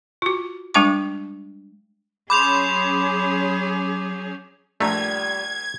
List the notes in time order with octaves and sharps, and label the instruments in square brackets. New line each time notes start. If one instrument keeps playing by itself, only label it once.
[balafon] F4 F#4
G3 G#3 D4 G5 C#6 D6
[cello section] F#3 C#4 G#4 [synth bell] B5 C6 [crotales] D6 G6 F7
[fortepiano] A#1 A#5 [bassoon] G3 [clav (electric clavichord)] A3 [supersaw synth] G#6